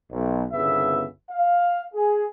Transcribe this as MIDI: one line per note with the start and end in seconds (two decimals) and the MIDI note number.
0.11 0.44 35
0.52 1.05 31
0.52 1.05 36
0.52 1.05 49
0.52 1.05 59
0.52 1.05 68
0.52 1.05 76
1.30 1.85 77
1.94 2.25 68